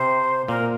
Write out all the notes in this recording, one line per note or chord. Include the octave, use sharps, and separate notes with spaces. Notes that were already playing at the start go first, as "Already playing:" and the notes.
Already playing: C3 C5
A#2 A#4